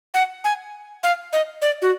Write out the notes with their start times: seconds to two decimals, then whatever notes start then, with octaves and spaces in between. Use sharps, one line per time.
0.14 F#5
0.44 G#5
1.03 F5
1.33 D#5
1.62 D5
1.82 F#4